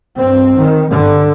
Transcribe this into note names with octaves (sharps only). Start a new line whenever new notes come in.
G2 C4
D#3
G2 D3